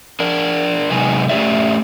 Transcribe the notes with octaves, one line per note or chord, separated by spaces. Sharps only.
D4 A#4
C3 F#3 G#3 B3 D#4 G#5
A3 C#4 E4 G4 D5 E5